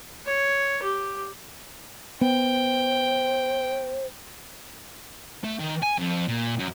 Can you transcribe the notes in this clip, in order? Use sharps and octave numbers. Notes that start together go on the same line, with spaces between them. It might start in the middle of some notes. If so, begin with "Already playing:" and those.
C#5
G4
B3 C5 G5
A3
D#3
G#5
F2
A#2
F#2